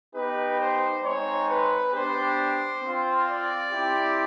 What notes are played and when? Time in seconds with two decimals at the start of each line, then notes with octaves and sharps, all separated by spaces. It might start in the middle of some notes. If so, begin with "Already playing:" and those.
0.14 B3 D#4 G4 B4
0.58 C5
1.02 G#3 C4 D#4 C#5
1.48 B4
1.93 B3 D4 G4 C5
2.82 C4 F4
3.27 D5
3.71 C4 E4 G4